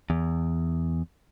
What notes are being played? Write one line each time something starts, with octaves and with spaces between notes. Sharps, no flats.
E2